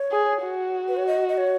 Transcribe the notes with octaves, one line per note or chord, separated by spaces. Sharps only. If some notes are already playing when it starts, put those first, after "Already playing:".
Already playing: C#5
G#4
F#4
B4
C#5
D#5
D#5
C#5